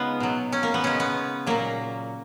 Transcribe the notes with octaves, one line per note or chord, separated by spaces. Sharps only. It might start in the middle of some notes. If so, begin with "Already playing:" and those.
Already playing: C#3 G#3 B3 D#4 F4
B2 F#3
C#4
A#3
B3
C#3 G#3 C#4
B3
A#2 F#3 A#3